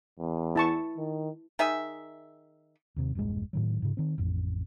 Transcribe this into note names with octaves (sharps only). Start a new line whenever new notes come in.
E2
E4 A5 C#6
D#3
D#3 G#4 E5
D#2 C3
E1 A#1 G2 G#3
A2 D#3 F#3
G#2 C#3
D#3 C4
A1 F2